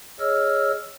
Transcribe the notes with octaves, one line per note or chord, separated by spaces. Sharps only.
G#4 C#5 D#5 E6 F6